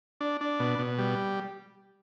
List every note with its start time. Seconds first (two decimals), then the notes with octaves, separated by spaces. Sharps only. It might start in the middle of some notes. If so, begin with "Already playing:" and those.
0.21 D4
0.41 D4
0.60 B2
0.79 B2
0.98 G3